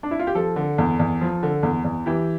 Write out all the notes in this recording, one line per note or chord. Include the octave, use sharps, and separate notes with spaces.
D4
E4
F4
G4
F3 A4
D3
E2
E2
F3
D3
E2
E2
E3 G4